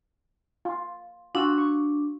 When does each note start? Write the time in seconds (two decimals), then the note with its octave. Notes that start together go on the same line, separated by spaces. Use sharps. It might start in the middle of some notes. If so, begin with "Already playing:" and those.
0.65 F4
1.35 D4 F4 F#4 E6
1.58 C#6